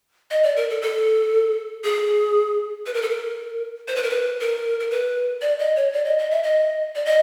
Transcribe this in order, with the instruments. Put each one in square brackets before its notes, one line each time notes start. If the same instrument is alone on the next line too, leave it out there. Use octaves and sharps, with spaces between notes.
[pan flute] D#5
D5
A#4
A4
A4
G#4
B4
A#4
A4
A#4
C5
B4
A#4
B4
A#4
A#4
B4
D5
D#5
C#5
D5
D#5
D#5
E5
D#5
D5
D#5